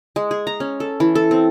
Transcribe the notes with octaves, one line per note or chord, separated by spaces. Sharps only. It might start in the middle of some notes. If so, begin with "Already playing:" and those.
G#3
G#4
A#5
C#4
A4
E3
A4
C4